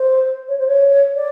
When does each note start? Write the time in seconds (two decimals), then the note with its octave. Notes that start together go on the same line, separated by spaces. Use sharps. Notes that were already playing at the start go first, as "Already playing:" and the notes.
Already playing: C5
0.48 C#5
0.59 C5
0.68 C#5
1.16 D5